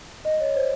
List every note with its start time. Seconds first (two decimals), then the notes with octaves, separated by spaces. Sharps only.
0.25 D#5
0.40 C#5
0.55 C5